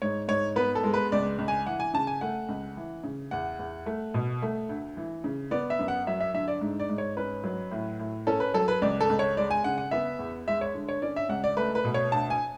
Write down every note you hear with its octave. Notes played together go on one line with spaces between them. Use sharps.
G#2 C#5
G#2 C#5
B3 B4
A4
G#3
B4
C#2 D5
C#2
G#5
E3 F#5
G#5
C#3 A5
G#5
A3 F#5
C#2
E3
C#3
E2 F#5
E2
A3
B2
A3
D2
E3
C#3
B3 D5
E5
F#2
F#5
F#3 E5
E5
D3 E5
D5
G#2
D5
G#2
C#5
C#4 B4
F#3
A2
A2
C#4 A4
B4
F#3 A4
B4
C#2 D5
A4
C#2
C#5
G#3 D5
G#5
C#3 F#5
F#5
B3 E5
E2
G#3 E5
C#5
D3
C#5
C#4 D5
E5
C#2 F#5
D5
A3 B4
B4
B2
C#5
D2 A5
G#5